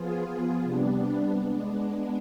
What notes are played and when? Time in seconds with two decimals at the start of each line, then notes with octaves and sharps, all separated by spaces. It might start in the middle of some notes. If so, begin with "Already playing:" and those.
Already playing: F3 B3 F4 G#4
0.63 C3 G3 B3 D4
1.37 G#3 B3 D4